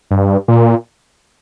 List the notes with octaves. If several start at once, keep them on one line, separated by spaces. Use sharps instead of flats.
G2
A#2